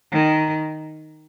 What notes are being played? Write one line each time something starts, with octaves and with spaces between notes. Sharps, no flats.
D#3